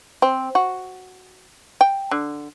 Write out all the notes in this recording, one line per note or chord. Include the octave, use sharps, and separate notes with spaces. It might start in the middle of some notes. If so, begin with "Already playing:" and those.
C4
F#4
G5
D3